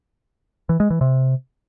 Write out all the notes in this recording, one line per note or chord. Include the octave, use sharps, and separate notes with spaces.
E3
G#3
E3
C3